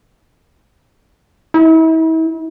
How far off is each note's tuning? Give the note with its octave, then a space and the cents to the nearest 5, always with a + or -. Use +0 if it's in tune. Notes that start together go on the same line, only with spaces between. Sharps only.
E4 -40